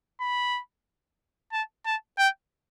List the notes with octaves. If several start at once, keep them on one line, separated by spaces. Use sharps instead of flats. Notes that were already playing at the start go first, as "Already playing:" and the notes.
B5
A5
A5
G5